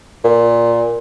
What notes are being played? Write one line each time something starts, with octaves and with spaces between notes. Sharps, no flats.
A#2